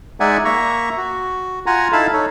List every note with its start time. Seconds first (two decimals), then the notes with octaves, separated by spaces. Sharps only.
0.20 G#3 D#4 D5 E5 F#5 G#5
0.45 A#3 E5 A#5 C#6
0.97 F#4
1.66 F4 F#5 G#5 A#5
1.92 D#4 E4 A4 F5 A5 B5
2.13 D#4 A4 C#5